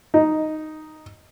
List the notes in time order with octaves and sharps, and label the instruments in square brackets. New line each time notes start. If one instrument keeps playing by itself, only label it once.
[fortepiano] D#4